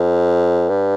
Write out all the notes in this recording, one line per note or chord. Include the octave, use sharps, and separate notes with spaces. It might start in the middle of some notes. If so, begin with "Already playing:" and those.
Already playing: F2
G2